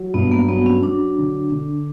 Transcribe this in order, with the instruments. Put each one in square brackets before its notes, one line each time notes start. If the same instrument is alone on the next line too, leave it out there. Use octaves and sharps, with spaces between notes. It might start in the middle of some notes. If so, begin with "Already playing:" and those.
Already playing: [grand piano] F#3
[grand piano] G2 [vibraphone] B3
[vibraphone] A#3
[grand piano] F#3 [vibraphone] B3
[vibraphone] C#4
[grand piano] F#3 [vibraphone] D4
[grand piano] D3
D3